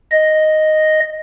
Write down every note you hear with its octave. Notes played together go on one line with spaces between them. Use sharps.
D#5